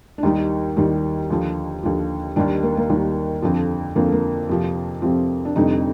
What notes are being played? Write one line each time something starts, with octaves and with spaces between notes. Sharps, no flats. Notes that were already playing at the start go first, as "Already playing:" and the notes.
D4
D#2 D#3 G3 D#4
D#2 D#3 G3
D#2 D3 F3
D#2 D3 F3
D#2 D#3 G3 D4
A#3
A#3
D#2 D#3 G3
F2 D3 F3
F2 D3 F3 A#3
A#3
F2 C3 F3
F2 C3 F3 C4
D4
F1 F2 D3 G3 D#4